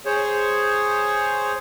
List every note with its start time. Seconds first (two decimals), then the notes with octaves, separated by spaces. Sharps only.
0.06 G#4 C5 C#5